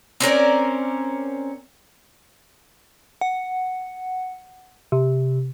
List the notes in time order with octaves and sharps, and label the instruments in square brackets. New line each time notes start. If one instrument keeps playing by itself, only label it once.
[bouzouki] C4 C#4 A#4 D5
[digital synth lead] F#5
C3